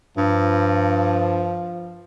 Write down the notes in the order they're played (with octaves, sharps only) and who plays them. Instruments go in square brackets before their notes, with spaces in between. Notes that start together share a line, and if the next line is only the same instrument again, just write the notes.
[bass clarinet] G2 [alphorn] F3